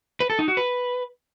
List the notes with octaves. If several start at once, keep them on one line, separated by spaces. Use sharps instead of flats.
B4
A4
D#4
F#4
B4